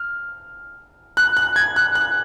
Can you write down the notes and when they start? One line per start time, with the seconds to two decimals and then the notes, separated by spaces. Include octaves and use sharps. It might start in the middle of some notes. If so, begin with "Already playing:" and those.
Already playing: F6
1.17 F#6
1.37 F#6
1.56 G#6
1.76 F#6
1.95 F#6